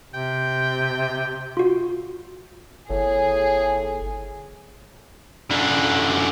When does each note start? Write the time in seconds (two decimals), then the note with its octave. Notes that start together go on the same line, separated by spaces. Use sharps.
0.14 C3 G5
1.57 F4 F#4
2.90 G1 A2 G#4
5.51 F#2 D3